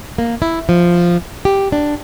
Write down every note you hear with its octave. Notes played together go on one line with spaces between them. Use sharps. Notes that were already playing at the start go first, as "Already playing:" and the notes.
A#3
E4
F3
G4
D4